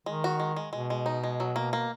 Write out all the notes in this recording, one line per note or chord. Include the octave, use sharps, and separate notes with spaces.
D#3 G#3
F#4
G#3
G#3
B2 G#3
G#3
D#4
G#3
F#3
A#3
A#3